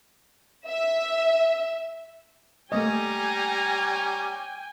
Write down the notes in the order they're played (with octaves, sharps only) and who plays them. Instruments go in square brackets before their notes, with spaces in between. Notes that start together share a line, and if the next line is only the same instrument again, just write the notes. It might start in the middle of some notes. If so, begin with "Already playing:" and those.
[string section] E5
[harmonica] G3 C#4 A#5 [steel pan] A3 A#3 D#5 [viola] G5 G#5